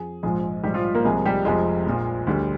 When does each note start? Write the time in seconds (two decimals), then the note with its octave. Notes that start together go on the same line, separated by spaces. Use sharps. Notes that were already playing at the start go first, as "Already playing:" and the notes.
Already playing: F2 G#4
0.23 A#1 G#2 F3 G#3 G#4
0.64 A#1 G#2 G3 G4
0.74 F3 F4
0.95 A#3 A#4
1.04 C2 C3 F3 G#3 G#4
1.25 G3 G4
1.45 F1 F2 C3 F3 G#3 G#4
1.87 A#1 A#2 F3
2.27 D2 D3 G3